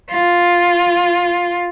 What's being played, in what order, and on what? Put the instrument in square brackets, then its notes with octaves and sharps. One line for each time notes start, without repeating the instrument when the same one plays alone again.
[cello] F4